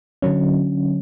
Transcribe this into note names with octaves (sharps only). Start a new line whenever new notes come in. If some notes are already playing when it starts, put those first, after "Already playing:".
D3 F#3 C#4